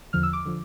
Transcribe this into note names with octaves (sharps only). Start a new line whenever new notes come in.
E2 D3 F3 F6
E6
D6
D3 F3